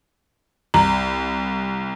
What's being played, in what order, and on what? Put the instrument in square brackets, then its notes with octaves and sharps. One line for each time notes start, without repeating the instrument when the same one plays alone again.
[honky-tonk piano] C2 [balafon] A#5